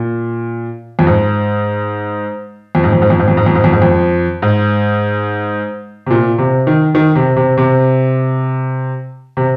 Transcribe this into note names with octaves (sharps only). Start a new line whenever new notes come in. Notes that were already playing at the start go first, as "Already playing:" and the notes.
Already playing: A#2
F2
G#2
F2
G#2
F2
G#2
F2
G#2
F2
G#2
F2
G#2
F2
G#2
F2
G#2
C3
A#2
C3
D#3
D#3
C3
C3
C3
C3